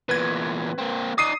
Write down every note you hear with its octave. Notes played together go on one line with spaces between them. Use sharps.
E2 A#2 B4 G#6
A#3 C4
D#4 D5 D#6 C7 D#7